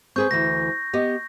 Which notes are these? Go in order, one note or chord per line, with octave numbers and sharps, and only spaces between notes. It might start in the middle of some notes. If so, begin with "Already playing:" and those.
C4 G#4 B4 C#6 G6
D2 E3 A#6
B3 G4 D#5